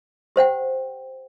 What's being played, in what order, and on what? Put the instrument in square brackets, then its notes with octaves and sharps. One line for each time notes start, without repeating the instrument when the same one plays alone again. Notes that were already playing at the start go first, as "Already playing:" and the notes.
[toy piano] G4 C5 F#5 G5